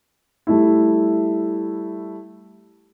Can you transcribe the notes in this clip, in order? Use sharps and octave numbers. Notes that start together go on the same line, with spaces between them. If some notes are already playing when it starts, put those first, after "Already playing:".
G3 A3 E4